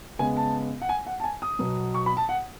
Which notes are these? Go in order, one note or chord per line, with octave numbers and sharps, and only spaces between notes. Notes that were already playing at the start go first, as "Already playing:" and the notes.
C#3 G#3 B3 G#5
A5
F#5
G#5
F#5
A5
G#5
D#6
B2 F#3 B3
C#6
B5
A5
F#5